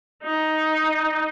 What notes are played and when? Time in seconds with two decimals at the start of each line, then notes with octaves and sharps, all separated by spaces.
0.23 D#4